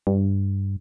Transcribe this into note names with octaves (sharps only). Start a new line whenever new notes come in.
G2